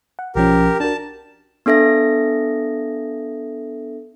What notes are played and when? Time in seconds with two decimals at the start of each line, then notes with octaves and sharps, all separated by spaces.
0.19 F#5
0.35 B1 F3 C#4 G4 A#4
0.80 D4 F#4 A#4 A5
1.66 B3 D4 A4 E5 A#6